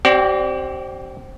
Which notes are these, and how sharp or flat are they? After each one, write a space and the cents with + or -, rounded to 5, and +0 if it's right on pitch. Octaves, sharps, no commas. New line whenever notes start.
C4 +15 G4 -40 D5 +0